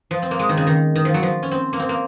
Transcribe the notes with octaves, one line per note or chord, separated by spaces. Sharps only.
F3
C4
A#3
G#3
D#3
C#3
D#3
D#3
F3
F#3
F3
C#4
C4
A#3
C4
A#3